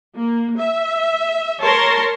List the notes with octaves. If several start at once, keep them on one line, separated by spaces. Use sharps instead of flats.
A#3
E5
A#4 C#5 A5 C6